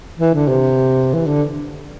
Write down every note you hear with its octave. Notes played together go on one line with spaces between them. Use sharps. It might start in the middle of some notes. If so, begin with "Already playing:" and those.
E3
D3
C3
E3
D3